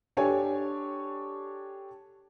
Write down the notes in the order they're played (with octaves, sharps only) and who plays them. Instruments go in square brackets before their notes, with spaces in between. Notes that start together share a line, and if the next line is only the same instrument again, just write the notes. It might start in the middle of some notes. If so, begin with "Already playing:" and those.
[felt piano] D4 G4 A4 C#5 G#5